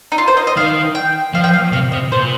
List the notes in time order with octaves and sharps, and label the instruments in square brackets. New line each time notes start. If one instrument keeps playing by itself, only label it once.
[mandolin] D#4
F4
C5
D#5
D#5
[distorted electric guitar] D#3 [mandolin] F5
[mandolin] G5
[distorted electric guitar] F3 [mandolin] F5
[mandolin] G5
F5
[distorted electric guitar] C3 [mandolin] F5
[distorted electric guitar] C3 [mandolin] D#5
[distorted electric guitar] A#2 [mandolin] C5